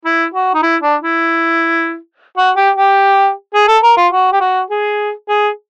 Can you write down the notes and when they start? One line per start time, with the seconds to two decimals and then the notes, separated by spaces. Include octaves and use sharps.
0.05 E4
0.34 F#4
0.54 D#4
0.62 E4
0.82 D4
1.02 E4
2.37 F#4
2.57 G4
2.77 G4
3.54 G#4
3.68 A4
3.83 A#4
3.97 F4
4.12 F#4
4.33 G4
4.41 F#4
4.70 G#4
5.29 G#4